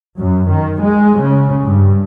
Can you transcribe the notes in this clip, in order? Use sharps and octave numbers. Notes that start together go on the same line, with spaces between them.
F#2
D#3
G#3
C#3
G2